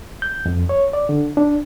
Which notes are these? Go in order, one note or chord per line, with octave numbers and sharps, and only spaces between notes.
G6
F2
C#5
D5
D3
D4